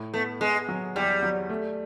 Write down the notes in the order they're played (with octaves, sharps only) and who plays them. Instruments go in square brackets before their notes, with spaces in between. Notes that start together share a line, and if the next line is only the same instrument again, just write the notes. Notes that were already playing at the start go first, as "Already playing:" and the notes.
Already playing: [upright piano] A2
[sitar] A3 [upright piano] B3
[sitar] G#3 [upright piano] B3
[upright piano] F#3
[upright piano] E2 [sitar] G3
[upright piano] F#3
A3